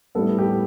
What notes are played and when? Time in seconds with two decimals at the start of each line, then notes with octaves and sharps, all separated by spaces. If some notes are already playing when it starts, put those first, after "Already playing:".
0.15 A2 G3 B3 A4
0.39 G4